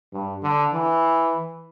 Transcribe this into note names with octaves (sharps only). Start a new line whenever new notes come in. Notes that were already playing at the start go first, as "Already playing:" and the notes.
G2
D3
E3